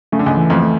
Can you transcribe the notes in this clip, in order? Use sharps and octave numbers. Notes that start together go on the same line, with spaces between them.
C#3 A3
D3
C#2 C#3
E3
F2 F3
A3